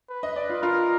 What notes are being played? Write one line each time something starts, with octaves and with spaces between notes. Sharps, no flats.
B4
D#5
D5
F4
F4 A#4